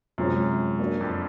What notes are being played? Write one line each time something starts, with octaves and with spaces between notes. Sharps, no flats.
F#2 C3 F3 G#3 C#4
A#3 D4 F#4 A#4 D5
F2